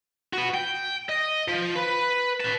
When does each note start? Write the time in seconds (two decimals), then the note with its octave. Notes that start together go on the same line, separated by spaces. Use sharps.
0.33 B3 F#4
0.54 G5
1.09 D#5
1.48 F3
1.76 B4
2.41 B4 A5